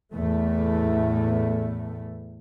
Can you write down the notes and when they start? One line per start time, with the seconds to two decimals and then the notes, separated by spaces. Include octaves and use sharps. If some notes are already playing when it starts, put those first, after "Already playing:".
0.14 E2 A2 A3